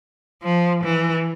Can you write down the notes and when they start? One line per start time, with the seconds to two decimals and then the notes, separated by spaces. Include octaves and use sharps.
0.44 F3
0.84 E3